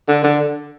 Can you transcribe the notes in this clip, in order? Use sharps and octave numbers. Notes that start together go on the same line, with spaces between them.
D3
D3